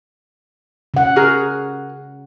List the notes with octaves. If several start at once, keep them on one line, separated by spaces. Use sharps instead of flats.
C#3 F#5
F#4 G#4 A#4